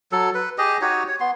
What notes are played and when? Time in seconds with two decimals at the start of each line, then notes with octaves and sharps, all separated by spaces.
0.12 F#3 A4
0.35 B4
0.58 G4 G#4 D#5
0.81 D#4 F#4 G4 C#5
1.08 C#5
1.20 B3 C6